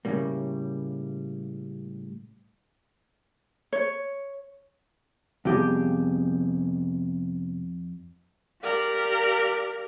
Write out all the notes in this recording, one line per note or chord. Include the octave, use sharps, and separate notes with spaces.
A2 C#3 G3 A#3
C#5
F2 C3 G3 B3 G4 G#4
G4 A#4 D5 F5